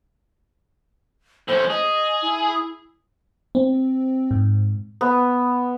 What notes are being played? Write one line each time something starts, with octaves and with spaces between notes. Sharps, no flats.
A2 C#4 C5
G#4 D#5
E4
C4
G#2
B3